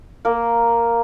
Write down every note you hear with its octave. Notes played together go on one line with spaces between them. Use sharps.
A#3 A#4